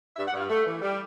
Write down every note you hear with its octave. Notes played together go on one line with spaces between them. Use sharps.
G2 E5
F#5
G2
F5
A3
E3
G3